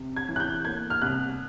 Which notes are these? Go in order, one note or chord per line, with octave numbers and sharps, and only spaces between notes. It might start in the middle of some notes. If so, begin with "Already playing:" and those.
Already playing: C3
G#6
E3
F#6
G6
A#3 G#6
F6
C2 F#6